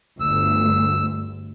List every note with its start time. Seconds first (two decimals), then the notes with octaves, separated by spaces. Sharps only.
0.20 G1 D2 E6